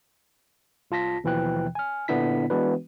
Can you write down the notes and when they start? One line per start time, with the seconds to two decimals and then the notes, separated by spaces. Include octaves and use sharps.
0.91 C2 F4 A5 A#6 B6
1.24 D#2 B2 E3 F3 G5 F#6
1.75 G#5 F6
2.08 A#2 D3 B3 D4 E4 B6
2.50 E3 G#3 B3 D4 F#4 B4